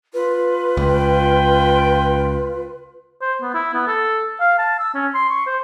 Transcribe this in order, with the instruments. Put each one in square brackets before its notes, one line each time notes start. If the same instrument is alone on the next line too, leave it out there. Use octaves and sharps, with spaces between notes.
[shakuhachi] F4 [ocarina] B4
[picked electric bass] C#2 [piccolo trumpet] G5
[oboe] C5
B3
E4
B3
A4
F5
A5
E6
C#4
C6
C#6
C5